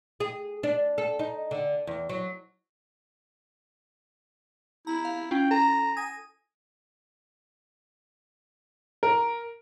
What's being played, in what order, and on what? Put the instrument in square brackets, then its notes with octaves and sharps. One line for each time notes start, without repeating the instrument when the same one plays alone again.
[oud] G#4
D4
A4
D#4
D3
E2
F#3
[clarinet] E4 [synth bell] A#5
[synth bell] F5
[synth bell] C#4 E4 F4 [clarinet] G5
[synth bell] A4 [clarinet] A#5
[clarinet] G#5 [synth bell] D#6 A#6
[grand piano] A#4